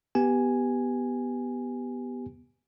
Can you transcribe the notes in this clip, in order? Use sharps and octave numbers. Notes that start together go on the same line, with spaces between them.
B3 G4 G#5